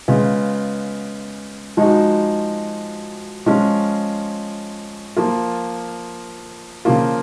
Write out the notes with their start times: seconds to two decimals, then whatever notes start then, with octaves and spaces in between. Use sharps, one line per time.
0.08 C#3 G#3 B3 F4
1.77 F3 G#3 D#4 F#4
3.46 F3 G#3 C#4 F4
5.16 F3 A#3 F4
6.85 C#3 F3 A#3 F4